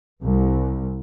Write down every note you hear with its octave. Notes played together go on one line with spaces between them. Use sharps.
C2